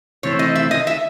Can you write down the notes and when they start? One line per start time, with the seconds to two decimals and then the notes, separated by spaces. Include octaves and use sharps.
0.23 C3 E3 A3 C4 E4 C#5
0.39 D#5
0.56 E5
0.71 D#5
0.87 E5